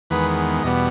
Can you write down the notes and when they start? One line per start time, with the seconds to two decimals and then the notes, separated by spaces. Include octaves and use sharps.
0.10 E2 D#3 G#3 B3 B4
0.63 E2 B2 G3 B3 D#5